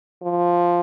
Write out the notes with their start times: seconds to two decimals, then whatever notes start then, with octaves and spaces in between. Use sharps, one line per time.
0.23 F3